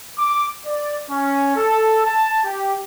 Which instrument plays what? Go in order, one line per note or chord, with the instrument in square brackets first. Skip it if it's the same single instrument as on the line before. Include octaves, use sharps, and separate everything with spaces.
[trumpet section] D6
D5
C#4
A4
A5
G4